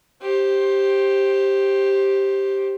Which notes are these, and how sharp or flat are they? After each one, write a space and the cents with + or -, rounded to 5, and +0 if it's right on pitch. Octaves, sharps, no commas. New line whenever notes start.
G4 +0 C5 +15